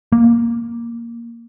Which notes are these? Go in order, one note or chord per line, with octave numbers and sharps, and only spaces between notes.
A#3